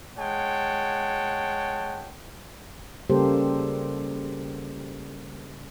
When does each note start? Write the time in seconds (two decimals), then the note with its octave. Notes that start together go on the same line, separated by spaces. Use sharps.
0.18 G#3 C#5 F#5 G5 A5
3.10 C#3 G3 A#3 G4 A4 C5